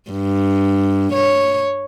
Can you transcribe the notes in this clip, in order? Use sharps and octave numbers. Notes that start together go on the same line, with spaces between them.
G2
C#5